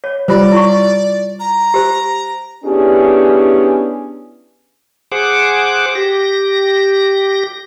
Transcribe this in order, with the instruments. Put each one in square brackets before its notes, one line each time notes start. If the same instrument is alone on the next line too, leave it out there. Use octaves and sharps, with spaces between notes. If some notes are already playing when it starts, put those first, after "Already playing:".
[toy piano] C#5
[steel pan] G3 [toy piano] F4 C5 [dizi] D5
[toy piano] E4 C6 C#6
[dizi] A#5
[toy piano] G4 C5
[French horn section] B3 C#4 D4 E4 G4 G#4
[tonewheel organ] G#4 C5 F#5 D6
G4 A#6